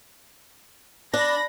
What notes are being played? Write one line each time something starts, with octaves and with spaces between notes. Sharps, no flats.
D4 B5 A#6